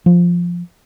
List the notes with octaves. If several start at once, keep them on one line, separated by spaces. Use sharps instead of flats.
F3